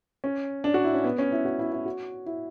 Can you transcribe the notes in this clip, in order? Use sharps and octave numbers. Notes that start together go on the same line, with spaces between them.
C#4
D4
F#4
E4
C#4
B3
C#4
E4
F#4
E4
E4
F#4
E4